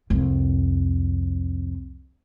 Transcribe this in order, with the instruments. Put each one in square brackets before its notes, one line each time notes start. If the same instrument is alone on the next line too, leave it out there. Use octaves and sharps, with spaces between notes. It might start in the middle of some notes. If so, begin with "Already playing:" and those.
[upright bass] C2 F2